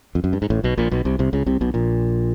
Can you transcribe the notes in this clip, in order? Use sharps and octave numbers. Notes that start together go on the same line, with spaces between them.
F2
F#2
G2
G#2
A1 A2
B1 B2
A#1 A#2
B1 B2
C2 C3
C2 C3
C#2 C#3
C2 C3
B1 B2
A#1 A#2